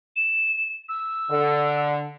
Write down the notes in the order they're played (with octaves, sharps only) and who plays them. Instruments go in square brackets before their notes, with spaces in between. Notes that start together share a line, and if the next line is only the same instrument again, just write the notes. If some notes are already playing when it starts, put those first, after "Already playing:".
[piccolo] E7
E6
[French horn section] D3